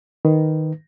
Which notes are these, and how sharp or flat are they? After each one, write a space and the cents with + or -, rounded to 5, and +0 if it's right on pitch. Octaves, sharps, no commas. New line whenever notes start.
D#3 +0 B4 +0